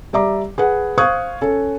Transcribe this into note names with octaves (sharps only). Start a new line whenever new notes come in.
G3 D5 E5 A#5 D6
G#4 B4 F#5
C5 F5 C#6 D#6 F#6 G#6
C#4 A4